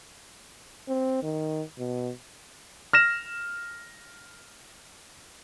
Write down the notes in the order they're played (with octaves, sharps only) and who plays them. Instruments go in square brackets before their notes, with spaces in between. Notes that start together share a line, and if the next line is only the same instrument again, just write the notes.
[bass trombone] C4
D#3
B2
[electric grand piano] F6 A#6 E7